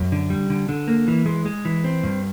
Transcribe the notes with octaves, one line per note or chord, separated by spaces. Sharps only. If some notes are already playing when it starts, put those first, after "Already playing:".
Already playing: F#2
D3
G3
D3
D3
A#3
E3
G#3
G#3
E3
C4
G2